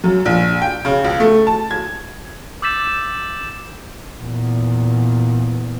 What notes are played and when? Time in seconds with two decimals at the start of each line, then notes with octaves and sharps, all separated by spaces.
0.04 F#2
0.25 A#1
0.62 G5
0.85 C#3
1.04 C#2
1.20 A3
1.47 A5
1.71 G#6
2.62 D6 E6 G6 A6 B6 E7
4.19 E2 A#2